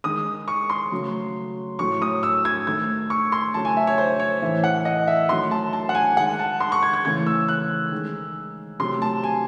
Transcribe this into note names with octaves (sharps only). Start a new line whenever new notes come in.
D#3 G#3 D#6
C#6
C6
C#3 F#3 A3
A2 F#3 A3 C#6
D#6
E6
G#6
D#3 A3 G#6
C#6
C6
C#3 F#3 A3 A5
G#5
E5
C#5
C5
C#5
A2 E3 A3 E5
F#5
D#5
E5
D#3 F#3 A3 C6
A5
A5
F#5
G#5
D#3 G#3 F#5
A5
C6
C#6
G#6
G#6
C#3 E3 A3 G#6
E6
F#6
D#3 G#3
C3 F#3 A3 C6
A5
G#5